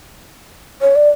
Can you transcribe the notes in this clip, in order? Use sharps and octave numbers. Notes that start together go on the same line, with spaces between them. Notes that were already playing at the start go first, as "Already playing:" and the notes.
C#5
D5